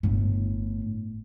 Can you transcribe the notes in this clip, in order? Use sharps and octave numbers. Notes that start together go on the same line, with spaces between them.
G1 A2